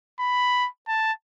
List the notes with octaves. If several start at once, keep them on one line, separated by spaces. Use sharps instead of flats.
B5
A5